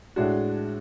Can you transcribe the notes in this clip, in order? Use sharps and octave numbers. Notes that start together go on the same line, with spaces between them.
A2 G#3 D4 F#4